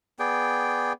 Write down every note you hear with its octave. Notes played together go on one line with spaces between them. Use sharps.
B3 G#4 D5 G5